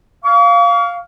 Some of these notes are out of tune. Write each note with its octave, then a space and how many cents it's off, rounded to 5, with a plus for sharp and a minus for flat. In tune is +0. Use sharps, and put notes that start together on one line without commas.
F5 +0 C#6 +45